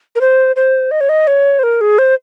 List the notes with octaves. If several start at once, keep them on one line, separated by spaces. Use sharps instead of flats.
A#4
C5
C5
D#5
C#5
D#5
C#5
C5
A#4
G#4
C5